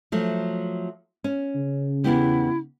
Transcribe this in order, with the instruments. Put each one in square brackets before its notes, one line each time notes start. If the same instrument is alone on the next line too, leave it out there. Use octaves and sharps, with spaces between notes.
[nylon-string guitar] F3 F#3 A3
C#4
[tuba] C#3
[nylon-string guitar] E2 B3 G4 [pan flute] E4